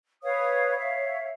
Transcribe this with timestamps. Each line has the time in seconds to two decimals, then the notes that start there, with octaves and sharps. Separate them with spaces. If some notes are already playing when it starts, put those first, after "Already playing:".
0.23 B4 C#5 F5 D#6
0.78 C#5 E5 F5